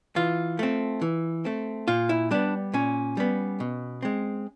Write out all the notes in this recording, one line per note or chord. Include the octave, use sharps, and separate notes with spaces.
E3 F4
A3 C4
E3
A3 C4
A#2 F4
E4
G3 B3 D4
A#2 C#4
G3 B3
B2
G#3 C4